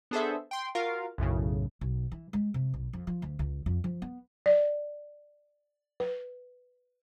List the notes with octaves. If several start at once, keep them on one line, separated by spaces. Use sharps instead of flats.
B3 D4 G#4 A4 C5 E5
G5 C6
F4 F#4 A#4 F5
B1 F#2 A2 C#3
B1
E3
G#3
C3
B1
F2
F3
D2
C#2
F2
F3
B3
D5
B4